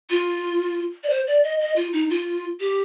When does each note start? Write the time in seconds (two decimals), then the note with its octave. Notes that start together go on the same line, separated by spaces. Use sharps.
0.10 F4
1.04 D5
1.10 C5
1.27 D5
1.44 D#5
1.60 D#5
1.76 F4
1.93 D#4
2.10 F4
2.60 G4